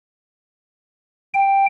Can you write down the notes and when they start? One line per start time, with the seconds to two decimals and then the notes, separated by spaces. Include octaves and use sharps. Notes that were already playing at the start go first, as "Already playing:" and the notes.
1.34 G5